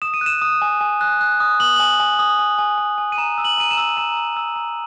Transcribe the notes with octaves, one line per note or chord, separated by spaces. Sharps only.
D#6 E7
D#7
F#6
E7
D#6
G#5
G#5
F#6
F#6
D#6
D#6 F#7
G#5 F#7
G#5
D#6
G#5
G#5
G#5
G#5
D#7
A#5 E7
E6
F#7
A#5 D#7
E7
E6
A#5 E7
E6
E6
A#5